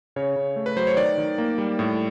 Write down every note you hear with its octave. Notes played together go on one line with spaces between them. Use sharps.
C#3 C#5
C#3
A3
B4
F#3 C5
C#5
D#3 D5
D#3
A#3
G3
A2